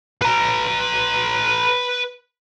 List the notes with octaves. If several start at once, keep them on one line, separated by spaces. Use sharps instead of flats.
B4 A#5